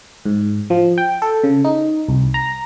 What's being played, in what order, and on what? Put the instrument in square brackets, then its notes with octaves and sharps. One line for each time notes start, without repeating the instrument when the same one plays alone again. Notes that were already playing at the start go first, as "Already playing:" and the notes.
[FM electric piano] G#2
F3
G5
A4
C#3
D#4
C2
A#5